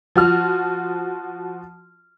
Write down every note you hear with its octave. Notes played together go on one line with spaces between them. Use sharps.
F3 F#4 F6